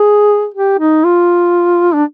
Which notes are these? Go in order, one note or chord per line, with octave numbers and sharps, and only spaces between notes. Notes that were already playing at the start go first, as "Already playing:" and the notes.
Already playing: G#4
G4
D#4
F4
D4